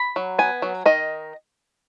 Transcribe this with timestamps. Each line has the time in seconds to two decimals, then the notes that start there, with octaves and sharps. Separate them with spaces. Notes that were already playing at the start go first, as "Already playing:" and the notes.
Already playing: B5
0.16 F#3
0.39 B3 G#5
0.62 F#3
0.86 D#3 D#5